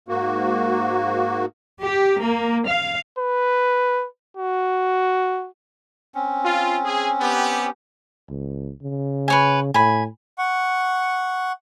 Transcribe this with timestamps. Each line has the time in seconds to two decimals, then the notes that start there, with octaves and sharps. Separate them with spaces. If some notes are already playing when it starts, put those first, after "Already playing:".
0.08 G#2 A#3 F#4
1.82 G4
2.21 A#3
2.66 F5
3.19 B4
4.37 F#4
6.15 C4 C#4
6.45 F4
6.84 G#4
7.21 B3 G4
8.30 C#2
8.82 C#3
9.28 B4 C#5 G#5
9.74 A2 G#5 B5
10.38 F#5 C#6